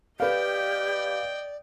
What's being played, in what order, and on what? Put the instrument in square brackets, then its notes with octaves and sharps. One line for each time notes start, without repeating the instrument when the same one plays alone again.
[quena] G4 [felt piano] B4 F5 [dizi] D5 [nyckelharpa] D#5 G5